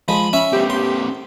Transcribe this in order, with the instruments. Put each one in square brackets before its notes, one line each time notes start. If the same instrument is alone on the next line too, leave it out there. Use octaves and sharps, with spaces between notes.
[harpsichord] F3 G#3 [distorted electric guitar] B5
[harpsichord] C#4 E5
[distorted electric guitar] A#3 C4 [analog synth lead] G4
[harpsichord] C6